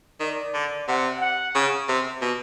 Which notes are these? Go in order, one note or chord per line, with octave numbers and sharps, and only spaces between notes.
D#3 D5
D3
C3 F#5
F#5
C#3
C3
B2